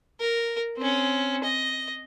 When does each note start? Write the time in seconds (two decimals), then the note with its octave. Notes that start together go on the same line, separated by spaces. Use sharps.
0.19 A#4
0.77 C4 C#4
1.43 D#5